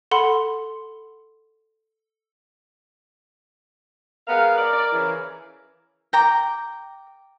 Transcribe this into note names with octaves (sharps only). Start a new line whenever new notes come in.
A4 F#5 B5 C6
G#3 B3 A#4 F5
D5
D5
C#3 E3
G5 A#5 D6